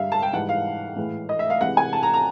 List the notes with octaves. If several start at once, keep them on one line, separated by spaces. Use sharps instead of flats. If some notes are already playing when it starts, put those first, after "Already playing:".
Already playing: G2 D3 G3 E5 F5
A5
G5
G#2 E3 G3 F#5
F5
A2 E3 G#3
D#5
E5
F5
C3 E3 G#3 F#5
G#5
A5
A#5
A#5